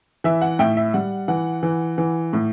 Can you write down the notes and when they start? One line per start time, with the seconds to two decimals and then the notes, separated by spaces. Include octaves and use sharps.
0.24 E3 E5
0.42 F#5
0.59 A2 E5 G5
0.77 E5
0.94 G3 F#5
1.28 E3 F#5
1.63 E3
1.98 E3
2.33 A2